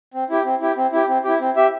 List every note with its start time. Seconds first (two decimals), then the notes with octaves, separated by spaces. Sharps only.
0.14 C4
0.30 E4 G4
0.45 C4
0.61 E4 G4
0.77 C4
0.92 E4 G4
1.08 C4
1.24 E4 G4
1.40 C4
1.56 G4 E5